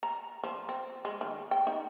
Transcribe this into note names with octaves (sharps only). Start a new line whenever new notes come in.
A#5
F3
C4
G#3
D#3
G5
D#4